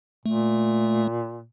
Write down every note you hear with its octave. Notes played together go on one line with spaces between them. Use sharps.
A#2 A3